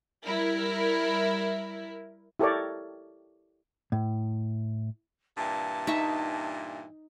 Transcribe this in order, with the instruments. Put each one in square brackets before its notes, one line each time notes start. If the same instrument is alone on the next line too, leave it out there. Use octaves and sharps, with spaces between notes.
[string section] G3 E4 A#4
[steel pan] E4 G4 A4 A#4 C#5 D5
[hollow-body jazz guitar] A2
[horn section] G2 A#2 E3 [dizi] A5
[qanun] D#4 E5 C#6